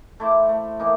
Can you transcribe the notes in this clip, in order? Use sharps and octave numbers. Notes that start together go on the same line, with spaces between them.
A3 E4 C5 D6
A3
E3 A#3 D#4